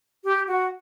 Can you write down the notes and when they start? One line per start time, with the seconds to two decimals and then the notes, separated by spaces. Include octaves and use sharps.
0.24 G4
0.48 F#4